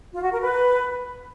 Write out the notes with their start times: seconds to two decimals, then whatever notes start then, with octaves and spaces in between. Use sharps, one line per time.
0.13 F4
0.22 F#4
0.31 A#4
0.40 B4